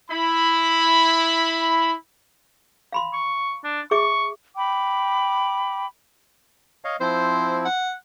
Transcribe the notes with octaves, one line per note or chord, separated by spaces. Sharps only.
E4 B5
F5 B5 C6
C#6
D4
G#4 E5 C#6 D6
G5 B5 D6
C#5 D#5 F5
F3 C4 E4 C5
F#5